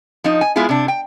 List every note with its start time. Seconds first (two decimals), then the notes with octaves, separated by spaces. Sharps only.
0.24 F3 D#4
0.41 G#5
0.56 G#3 B3 E4 F4 G#4
0.69 C3 D4
0.88 G5